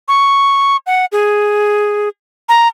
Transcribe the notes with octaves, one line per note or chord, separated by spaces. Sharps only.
C#6
F#5
G#4
A#5